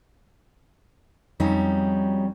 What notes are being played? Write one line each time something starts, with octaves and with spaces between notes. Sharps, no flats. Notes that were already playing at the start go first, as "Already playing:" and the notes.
F2 F#3 G3 C#4 D#4